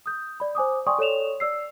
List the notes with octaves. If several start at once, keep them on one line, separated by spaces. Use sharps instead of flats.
D#6 G6
D5 B5
C5 G#5 D6 D#6
D5 G5 G#5 C6 C#6 D#6
A4 C#5 D5 E7 F7
D5 E6 C7